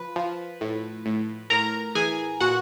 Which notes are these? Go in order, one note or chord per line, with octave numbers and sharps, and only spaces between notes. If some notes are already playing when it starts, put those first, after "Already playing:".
Already playing: F3 B4
F3
A2
A2
A2 A#4 A#5
E3 G#4 G#5
A#2 F#4 F#5